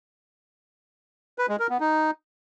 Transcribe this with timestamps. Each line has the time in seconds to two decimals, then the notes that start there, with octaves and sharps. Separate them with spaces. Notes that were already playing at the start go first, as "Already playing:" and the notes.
1.38 B4
1.49 G#3
1.59 A#4
1.70 B3
1.80 D#4